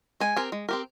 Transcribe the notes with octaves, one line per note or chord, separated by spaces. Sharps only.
G#3 G#5
C4 G4 A#4
G#3
C4 G4 A#4